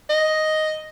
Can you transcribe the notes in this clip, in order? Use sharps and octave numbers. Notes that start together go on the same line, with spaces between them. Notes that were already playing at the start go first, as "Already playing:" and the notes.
D#5